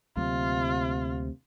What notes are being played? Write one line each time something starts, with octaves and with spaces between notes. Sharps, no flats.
D2 C3 F#3 A#3 F4